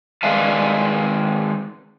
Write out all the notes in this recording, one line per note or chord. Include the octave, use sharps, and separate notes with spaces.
D#3 G#3 B4 D5 F5 A5